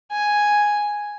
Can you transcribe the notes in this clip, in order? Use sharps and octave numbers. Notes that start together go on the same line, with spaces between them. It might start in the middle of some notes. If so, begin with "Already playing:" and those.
G#5